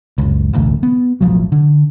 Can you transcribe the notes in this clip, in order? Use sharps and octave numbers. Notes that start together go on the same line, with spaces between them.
F#1 C#2
E1 A1 D2
B3
E1 A1 F3 F#3
D3